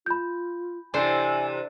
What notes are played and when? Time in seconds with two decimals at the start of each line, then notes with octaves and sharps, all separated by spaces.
0.06 F4 B5 G6
0.94 C3 E3 D4 A4 C5 G#5